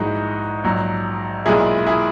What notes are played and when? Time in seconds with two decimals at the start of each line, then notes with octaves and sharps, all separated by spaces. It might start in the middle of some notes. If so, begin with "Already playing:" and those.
Already playing: A#1 G#2 E3 G#3 D#4 F#4
0.64 A#1 G#2 F#3
1.46 B1 A#2 G#3 E4 G#4
1.87 E4 G#4